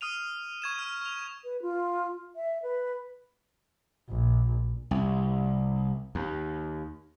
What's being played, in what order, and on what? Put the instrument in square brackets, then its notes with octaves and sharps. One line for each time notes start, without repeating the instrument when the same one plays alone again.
[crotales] D#6 F6 D#7 F7
C#6 G#6 E7
F6
C#6 F7
[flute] B4
F4
E5
B4
[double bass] A#1
[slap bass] C2
D#2